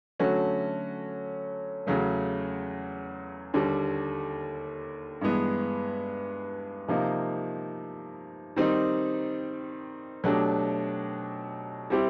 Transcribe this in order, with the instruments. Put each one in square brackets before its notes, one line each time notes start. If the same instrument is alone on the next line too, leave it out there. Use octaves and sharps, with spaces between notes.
[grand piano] D3 F#3 A3 C#4 F#4
E2 C#3 F#3 A3
D#2 D3 G3
G2 E3 G#3 B3
C3 F3 A#3 D#4
D#3 G3 C4 D#4
B2 F#3 A3 D4 G4
G3 C4 E4 G4